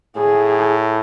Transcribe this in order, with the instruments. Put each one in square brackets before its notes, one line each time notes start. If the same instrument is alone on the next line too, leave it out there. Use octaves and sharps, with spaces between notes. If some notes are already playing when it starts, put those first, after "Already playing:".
[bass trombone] A2 [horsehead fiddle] G#4